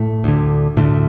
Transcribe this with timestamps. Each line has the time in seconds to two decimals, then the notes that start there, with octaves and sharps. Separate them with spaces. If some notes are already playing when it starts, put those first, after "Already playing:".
Already playing: A2 A3
0.24 D2 D3
0.77 D2 A2 D3 A3